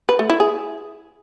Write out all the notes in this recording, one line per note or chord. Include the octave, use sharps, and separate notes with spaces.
B4
A3
E4
G#4